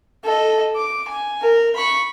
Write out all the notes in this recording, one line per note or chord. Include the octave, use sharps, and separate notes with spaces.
A4 D#5
D6
G#5
A#4
B5 C#6